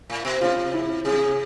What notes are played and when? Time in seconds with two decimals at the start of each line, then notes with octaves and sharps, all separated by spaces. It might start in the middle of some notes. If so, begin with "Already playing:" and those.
0.10 A2
0.25 B2
0.41 C3 F4
0.73 E4
1.05 C3 G#4